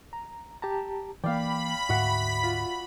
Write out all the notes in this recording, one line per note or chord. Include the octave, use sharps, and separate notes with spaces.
A#5
G4 A5 A#5
E3 A#3 D5 F5 G5 B5
D2 G#2 F#4 E5 F#5
F4